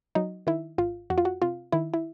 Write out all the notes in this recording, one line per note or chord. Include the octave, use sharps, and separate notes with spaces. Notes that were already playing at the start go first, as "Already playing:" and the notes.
F#3 D#4
D#3 E4
G#1 F4
F2 F#4
F4
F#4
C3 F4
D#3 E4
E4